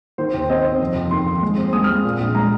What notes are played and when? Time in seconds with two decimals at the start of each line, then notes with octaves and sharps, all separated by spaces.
0.18 D#3 C5
0.29 C5
0.34 D#2
0.39 C5
0.49 C4 D#5
0.64 C4
0.80 F2
0.96 F2
1.11 D#3 C6
1.26 F2
1.42 G#3
1.58 C4
1.73 G#3 D#6
1.84 F6
1.89 G#3
2.04 A#2
2.20 A#1
2.35 G#3 A#5